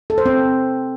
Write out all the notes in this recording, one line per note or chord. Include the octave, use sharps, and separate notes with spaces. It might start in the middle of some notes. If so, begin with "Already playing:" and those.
A4
C5
C4